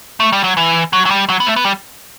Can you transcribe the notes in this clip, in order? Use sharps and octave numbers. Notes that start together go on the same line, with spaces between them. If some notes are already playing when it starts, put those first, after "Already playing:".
A3
G3
F#3
E3
F#3
F#3
G3
F#3
B3
A3
B3
G3